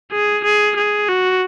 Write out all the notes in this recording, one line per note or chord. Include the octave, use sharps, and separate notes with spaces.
G#4
G#4
G#4
F#4